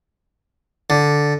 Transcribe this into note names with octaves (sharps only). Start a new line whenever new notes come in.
D3